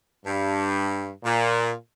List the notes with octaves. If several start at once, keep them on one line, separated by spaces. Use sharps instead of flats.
G2
A#2